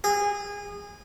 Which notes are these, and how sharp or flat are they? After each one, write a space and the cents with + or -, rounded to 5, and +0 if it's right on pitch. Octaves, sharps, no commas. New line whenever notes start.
G#4 -25